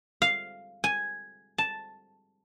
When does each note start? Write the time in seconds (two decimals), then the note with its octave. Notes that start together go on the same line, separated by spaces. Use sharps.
0.22 F5
0.84 G#5
1.58 A5